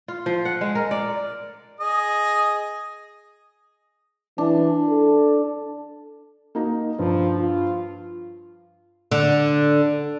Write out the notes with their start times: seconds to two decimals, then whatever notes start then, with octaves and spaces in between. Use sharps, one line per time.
0.08 F4
0.26 F3
0.45 F#5
0.61 G#3
0.75 A#4
0.91 D5
1.80 G#4 D#5
4.38 E3 D4
4.89 A4
6.55 A#3 D#4 F#4
6.99 G2 F3
7.37 F4
9.11 D3